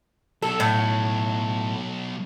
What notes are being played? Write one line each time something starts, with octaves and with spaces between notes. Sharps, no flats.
B1 A4
A2